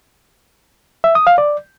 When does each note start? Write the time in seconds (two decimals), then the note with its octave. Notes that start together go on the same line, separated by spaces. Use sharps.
1.04 E5
1.15 D#6
1.27 F5
1.38 D5